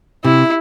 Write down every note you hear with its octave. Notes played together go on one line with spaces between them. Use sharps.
C3 E4